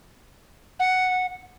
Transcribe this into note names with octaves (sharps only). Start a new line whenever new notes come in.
F#5